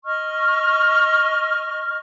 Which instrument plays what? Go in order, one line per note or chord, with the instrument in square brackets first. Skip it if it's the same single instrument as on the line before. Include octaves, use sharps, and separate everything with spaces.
[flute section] D#5 C#6 F6